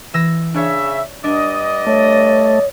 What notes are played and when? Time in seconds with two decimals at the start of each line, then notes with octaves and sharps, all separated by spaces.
0.14 E3 E6 A#6
0.54 C#3 D4 C#5 E5
1.24 G2 D4 D5 D#5
1.87 A3 C#5